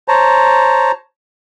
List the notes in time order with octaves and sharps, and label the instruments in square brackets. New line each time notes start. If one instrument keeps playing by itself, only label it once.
[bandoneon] C5 C#5 A5 A#5